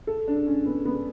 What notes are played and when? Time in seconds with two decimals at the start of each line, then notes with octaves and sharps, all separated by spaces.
0.07 A4
0.28 D4
0.47 C#4
0.66 B3
0.85 B3